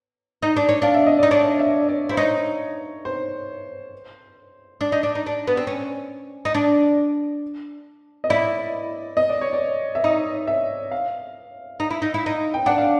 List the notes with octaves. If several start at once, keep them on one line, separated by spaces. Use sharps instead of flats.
D#4
D4
C#4
D4 F5
E5
D#5
D#4 D5
D4 C#5
E5
D5
E4 C5
D#4 C#5
C5
D4
D#4
D4
D#4
D4
B3
C4
C#4
D#4
D4
D#5
E4 D5
D#5
D5
C#5
D5
E5
D#4 D#5
E5
F5
D#4
E4
D#4
E4
D#4
G5
D4 F#5
F5